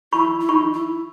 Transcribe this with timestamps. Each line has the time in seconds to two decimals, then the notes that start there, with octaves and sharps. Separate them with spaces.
0.12 E4 B5 C#6
0.41 E4
0.49 D#4 B5 C#6
0.74 E4